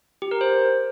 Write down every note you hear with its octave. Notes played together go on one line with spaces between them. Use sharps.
G4
A#4
C5